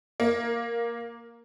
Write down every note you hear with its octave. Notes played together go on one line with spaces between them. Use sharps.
A#3